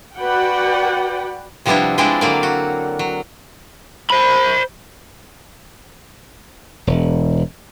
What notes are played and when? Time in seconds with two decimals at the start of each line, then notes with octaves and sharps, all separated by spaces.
0.18 F#4 B4 D5 F#5 G5
1.66 C3 F3 G3 B3 D4 E4
1.98 F3 G#3 C4 D4 E4 D5
2.21 D3 F#3 A#3 D5
2.43 F#4
2.99 F#3
4.10 C5 B5
6.87 E1